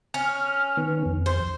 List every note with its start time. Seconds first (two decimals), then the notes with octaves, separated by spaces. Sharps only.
0.14 C#4 F6
0.77 D#3 B3
1.06 F2
1.26 C5